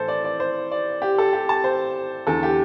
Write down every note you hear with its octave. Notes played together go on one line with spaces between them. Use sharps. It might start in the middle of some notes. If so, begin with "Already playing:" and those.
Already playing: A2 E3 A4 C5
D5
D5
C5
D5
G4
A4
G4
A5
C5
E2 D3 A4
G4